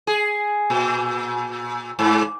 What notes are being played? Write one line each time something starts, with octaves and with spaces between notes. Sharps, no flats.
G#4
A#2
G#2